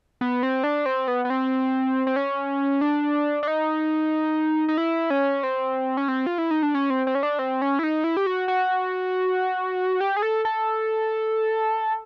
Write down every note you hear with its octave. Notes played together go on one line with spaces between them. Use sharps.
B3
C4
D4
C4
B3
B3
C4
C4
C#4
D4
D4
D#4
D#4
E4
C#4
C4
C#4
C4
F4
E4
D#4
D4
C#4
C4
C4
C#4
D4
C4
C#4
E4
D#4
E4
G4
F#4
F#4
G4
G#4
A4
A4